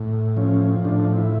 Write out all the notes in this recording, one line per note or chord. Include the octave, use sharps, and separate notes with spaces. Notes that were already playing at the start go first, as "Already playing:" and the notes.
Already playing: A2
F3 C#4
A2 D4
E4